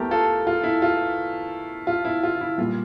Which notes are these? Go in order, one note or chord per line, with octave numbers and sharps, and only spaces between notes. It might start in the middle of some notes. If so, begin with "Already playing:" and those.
Already playing: E2 E3 A3 G4 A#4
F4 A4
F4
E4
F4
F4
E4
F4
E4
A#2 G3 F4